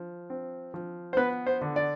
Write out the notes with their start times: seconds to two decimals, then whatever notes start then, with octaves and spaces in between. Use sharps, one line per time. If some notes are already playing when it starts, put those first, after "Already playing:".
Already playing: F3
0.30 C4
0.74 F3
1.13 C5
1.17 B3 B4
1.47 C5
1.62 D3
1.76 D5